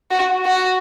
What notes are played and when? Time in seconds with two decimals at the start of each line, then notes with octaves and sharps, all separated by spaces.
0.11 F#4
0.45 F#4